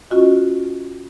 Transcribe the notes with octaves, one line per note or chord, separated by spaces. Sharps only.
C#4 F4 F#4 D#5